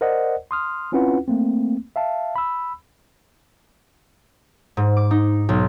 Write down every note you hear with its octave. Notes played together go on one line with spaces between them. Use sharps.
A#4 C5 D5 D#5 F#5
C6 D#6 F6
C4 C#4 E4 F4 B4 F#5
A3 A#3 C4
E5 F5 A5
B5 E6
G#2
D6
D#4
B1